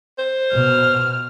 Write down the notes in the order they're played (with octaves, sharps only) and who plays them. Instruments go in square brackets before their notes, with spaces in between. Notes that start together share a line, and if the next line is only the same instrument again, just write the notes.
[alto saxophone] C5
[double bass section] B2 [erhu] F6